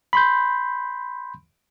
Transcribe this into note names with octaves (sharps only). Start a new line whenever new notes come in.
B5 C6 G6